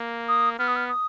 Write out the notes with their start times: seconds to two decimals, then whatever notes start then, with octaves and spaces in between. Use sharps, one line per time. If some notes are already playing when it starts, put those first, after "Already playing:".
Already playing: A#3
0.28 D#6
0.59 B3 F6
0.68 D#6
0.76 F6
0.89 D#6